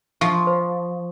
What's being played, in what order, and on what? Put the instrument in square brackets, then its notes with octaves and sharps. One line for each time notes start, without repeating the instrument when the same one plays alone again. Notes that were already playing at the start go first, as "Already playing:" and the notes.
[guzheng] F3 [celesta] C#6
[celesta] C5